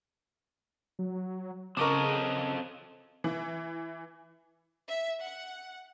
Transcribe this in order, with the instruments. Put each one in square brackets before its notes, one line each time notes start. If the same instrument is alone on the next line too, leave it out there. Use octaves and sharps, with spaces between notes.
[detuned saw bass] F#3
[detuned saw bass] C#3 [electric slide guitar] C4 A4 D#5 [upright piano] A#4 C#6 D6
[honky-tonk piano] E3
[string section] E5
F#5